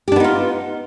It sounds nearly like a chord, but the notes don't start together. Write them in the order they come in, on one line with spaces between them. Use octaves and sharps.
G4 D4 B3 D#4 F4